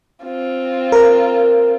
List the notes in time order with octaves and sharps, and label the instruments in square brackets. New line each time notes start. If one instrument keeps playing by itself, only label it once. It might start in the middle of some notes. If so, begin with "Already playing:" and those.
[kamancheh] C4 F4
[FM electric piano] A#4